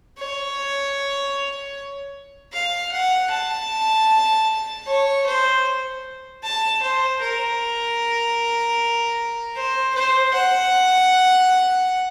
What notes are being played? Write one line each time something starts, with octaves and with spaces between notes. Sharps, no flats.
C#5
F5
F#5
A5
C#5
C5
A5
C5
A#4
C5
C5
F#5